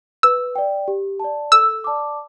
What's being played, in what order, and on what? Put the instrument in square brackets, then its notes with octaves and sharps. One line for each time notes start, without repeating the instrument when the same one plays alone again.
[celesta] B4 [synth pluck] E6
[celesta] D5 G5
G4
D5 A5
[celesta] A4 [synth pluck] E6
[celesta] D5 A5 D6